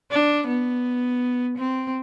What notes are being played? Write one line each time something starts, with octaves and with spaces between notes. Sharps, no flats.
D4
B3
C4